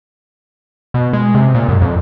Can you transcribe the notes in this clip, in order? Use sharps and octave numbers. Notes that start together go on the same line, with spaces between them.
B2
G#3
C3
A#2
F#2
F2